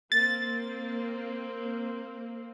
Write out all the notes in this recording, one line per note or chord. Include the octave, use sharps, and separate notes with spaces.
A#3 C4 A6